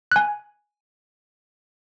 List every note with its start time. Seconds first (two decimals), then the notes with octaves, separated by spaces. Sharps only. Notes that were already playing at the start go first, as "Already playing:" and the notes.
0.12 G#5 F#6